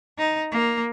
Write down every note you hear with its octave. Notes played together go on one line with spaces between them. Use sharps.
D#4
A#3